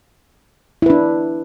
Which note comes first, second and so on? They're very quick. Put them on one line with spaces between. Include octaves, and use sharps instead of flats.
E4 B4 D4